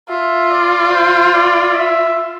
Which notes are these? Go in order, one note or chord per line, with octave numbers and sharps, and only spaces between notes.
F4 E5
D5
C5
D5
E5